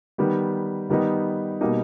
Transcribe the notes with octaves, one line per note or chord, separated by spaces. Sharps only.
D#3 G3 B3
D#3 G3 B3 D#4
B2 G3 A#3 D#4